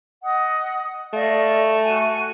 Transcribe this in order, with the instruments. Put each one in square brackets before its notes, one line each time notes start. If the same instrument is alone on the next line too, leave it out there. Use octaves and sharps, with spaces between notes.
[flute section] D#5 F#5 D#6
[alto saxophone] A3 [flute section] D5 D#5 F5
[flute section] F#4 G#5